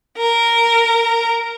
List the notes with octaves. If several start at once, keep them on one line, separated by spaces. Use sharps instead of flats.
A#4